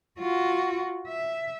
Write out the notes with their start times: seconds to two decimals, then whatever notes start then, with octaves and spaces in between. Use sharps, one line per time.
0.19 F4 F#4
1.08 E5